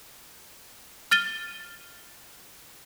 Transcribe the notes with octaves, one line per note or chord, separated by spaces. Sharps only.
F6 A6 D#7 G7